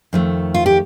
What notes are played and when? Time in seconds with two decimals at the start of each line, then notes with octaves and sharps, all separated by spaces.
0.13 F2 D#3 A3
0.54 F4
0.66 G4